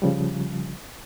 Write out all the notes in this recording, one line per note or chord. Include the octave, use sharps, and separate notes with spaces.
C#3 F3 G3